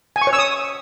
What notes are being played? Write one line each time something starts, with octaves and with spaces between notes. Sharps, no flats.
G#5
C#6
C#5
E6
D#6